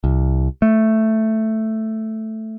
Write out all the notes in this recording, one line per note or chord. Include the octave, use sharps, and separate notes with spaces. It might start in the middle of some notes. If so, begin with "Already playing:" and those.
C2
A3